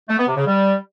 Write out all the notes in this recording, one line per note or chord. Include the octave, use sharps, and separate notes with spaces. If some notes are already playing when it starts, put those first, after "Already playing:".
A3
B3
C3
C#3
G3